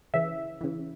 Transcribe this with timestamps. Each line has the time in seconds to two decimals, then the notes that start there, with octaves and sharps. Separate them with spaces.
0.14 C#3 E3 E5
0.61 C#3 E3